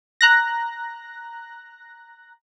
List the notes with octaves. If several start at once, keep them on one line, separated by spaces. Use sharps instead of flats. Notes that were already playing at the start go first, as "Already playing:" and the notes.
A#5 F#6 A#6